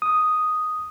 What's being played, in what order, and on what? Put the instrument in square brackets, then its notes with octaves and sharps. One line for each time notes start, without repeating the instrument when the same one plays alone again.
[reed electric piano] D#6